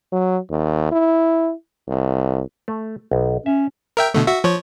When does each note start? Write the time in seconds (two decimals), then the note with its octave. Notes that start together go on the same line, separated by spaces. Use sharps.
0.12 F#3
0.51 D#2
0.92 E4
1.88 C2
2.68 A3
3.11 B1
3.46 C#4 E5
3.97 A#4 E5 G5
4.14 B2 D3 A3
4.27 F#4 E5
4.44 F3 C#5